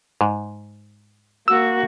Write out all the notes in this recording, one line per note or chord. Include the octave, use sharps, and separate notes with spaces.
G#2
A#3 F#4 E6